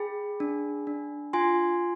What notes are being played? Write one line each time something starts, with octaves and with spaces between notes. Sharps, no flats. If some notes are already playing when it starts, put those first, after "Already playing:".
Already playing: G#4 G5 B5
D4
D4
F4 G#5 C6